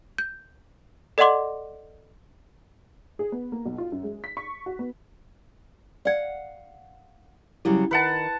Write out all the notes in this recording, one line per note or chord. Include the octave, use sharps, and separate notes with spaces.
G6
A4 D5 D#5 F#5 C6 D6
G#4
B3
A#3
B1
F4
F#2
G#3
B6
C#6
F#4
B3
D5 F5 F#5 G#6
C#3 F#3 G3 E4
D#3 B4 F#5 A5